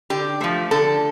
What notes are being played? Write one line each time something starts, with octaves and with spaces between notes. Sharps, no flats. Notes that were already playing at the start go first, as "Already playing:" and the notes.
D3 G4
F3 A3
D3 A4